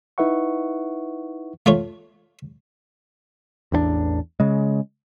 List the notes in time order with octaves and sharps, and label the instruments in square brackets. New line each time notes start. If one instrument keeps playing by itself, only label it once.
[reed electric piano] D#4 E4 B4 E5 F#5 C#6
[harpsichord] A3 F4 C#5
[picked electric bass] A1 E2 B3 D4
C#3 G#3